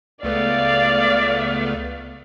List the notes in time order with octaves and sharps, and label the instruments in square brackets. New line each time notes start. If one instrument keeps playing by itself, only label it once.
[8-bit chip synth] C#2 A3 B3 [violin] D5 F5